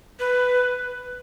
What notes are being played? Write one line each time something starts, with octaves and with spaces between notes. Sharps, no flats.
B4